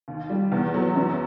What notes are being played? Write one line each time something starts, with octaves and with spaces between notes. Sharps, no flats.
D#2
G3
E2
F#3
F#2